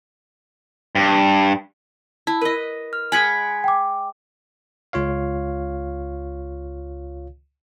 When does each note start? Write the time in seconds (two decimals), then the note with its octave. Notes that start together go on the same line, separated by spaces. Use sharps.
0.95 G2
2.27 E4 A5
2.41 A#4 B4 D#5
2.93 F6
3.12 G#3 F#5 G#5 B5 G#6 B6
3.64 G5 D6
4.93 C#2 F4 C#5 F5